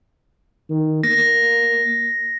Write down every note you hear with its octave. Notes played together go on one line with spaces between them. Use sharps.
D#3
A#3 A#6